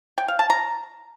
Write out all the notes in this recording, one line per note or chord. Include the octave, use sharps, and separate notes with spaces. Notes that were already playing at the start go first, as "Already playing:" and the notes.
G5
F5
A5
A#5